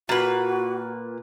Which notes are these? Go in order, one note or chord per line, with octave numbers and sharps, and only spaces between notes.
A#2 F#4 B4